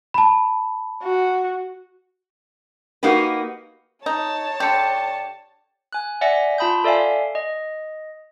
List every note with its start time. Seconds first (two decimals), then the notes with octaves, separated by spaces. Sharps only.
0.14 A5 B5
1.03 F#4
3.03 A#3 D#4 F#4 G4 B4
4.06 D#4 C#5 A5
4.60 D3 G4 G5 C#7
5.93 G#5 F#6
6.21 D5 E5 F#5 G#5 A#6 C#7
6.58 F4 A5 B5 D#6 G6
6.84 A4 D5 E5 F5 G#5
7.35 D#5